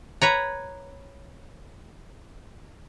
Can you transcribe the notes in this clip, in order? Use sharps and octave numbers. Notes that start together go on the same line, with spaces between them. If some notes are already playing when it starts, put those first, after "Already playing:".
B4 C#5 A#5